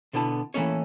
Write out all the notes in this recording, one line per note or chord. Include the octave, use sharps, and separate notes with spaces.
B2 D3 B3 E4 A5
E3 A3 A#3 C#4 C#5